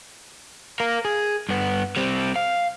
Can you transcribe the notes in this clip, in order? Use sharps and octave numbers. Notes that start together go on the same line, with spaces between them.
A#4 F5
G#4
G2 B3
G3 C4
F5